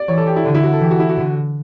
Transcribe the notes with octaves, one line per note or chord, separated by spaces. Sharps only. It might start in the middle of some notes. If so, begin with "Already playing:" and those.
Already playing: D5
E3 C#5
A4
G4
E4
D3
E4
F#4
A4
E3 G4
F#4
E4
F#4
D3